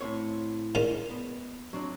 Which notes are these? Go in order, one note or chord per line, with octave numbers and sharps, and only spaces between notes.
A2 C4 C#5
A#2 G#3 C#4
B3
F#3 C4 D4